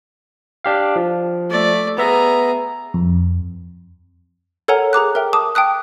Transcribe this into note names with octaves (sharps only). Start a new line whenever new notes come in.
D4 G4 F5
F3
A3 D5
B3 G#4 E5 A#5
F2
A4 A#4 C#5 F#5 G#5 A#5
G#4 A#5 D6 F#6
A#4 E5 G5
A5 D6 D#6
G5 A5 D#6 F#6